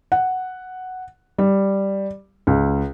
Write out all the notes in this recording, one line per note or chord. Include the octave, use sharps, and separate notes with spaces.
F#5
G3
C#2